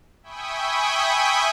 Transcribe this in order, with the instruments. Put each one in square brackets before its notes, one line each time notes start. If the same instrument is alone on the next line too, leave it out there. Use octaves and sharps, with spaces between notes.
[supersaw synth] E5 G5 G#5 B5 C#6 D#6